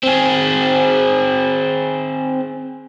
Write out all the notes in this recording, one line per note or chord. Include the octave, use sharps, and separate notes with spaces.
C4 G#4